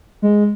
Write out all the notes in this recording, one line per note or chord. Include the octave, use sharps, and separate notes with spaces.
G#3